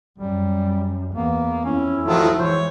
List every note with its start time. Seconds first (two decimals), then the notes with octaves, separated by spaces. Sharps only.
0.18 F#2 G3
1.15 E2 A#3 B3
1.65 F2 C#4 E4
2.05 D#3 F3 F#3 A3 F4
2.39 E3 G#3 C5 C#5